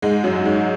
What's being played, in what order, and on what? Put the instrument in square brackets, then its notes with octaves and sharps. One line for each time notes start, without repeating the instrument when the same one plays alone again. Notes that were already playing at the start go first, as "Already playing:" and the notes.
[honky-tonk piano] G#2 G#3
F#2 F#3
G#2 G#3